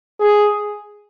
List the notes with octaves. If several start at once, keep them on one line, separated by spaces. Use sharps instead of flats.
G#4